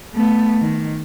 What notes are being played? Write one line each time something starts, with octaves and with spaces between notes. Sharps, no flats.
A3 B3
D#3